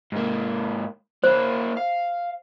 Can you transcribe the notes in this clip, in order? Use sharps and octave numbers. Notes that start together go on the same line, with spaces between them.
G#2 A#3
A#3 E4 C5
F5